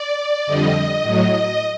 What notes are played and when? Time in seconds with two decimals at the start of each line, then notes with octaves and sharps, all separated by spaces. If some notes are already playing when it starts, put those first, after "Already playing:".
Already playing: D5
0.46 F2 D3 G3 D#5
1.02 A2 F#3